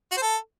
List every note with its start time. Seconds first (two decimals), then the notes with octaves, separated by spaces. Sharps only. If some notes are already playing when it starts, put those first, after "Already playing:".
0.12 F#4
0.17 C5
0.22 A4